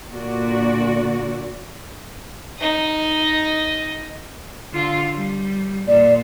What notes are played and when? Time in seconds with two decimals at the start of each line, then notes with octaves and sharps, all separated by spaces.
0.11 A#2 D3 F#4 D5
2.58 D#4 D#5
4.73 D3 F4
5.15 G3
5.87 A#2 D5